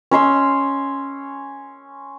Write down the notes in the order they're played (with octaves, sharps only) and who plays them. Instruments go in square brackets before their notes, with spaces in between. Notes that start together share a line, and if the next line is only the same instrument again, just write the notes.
[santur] C#4 C#5 C6 E6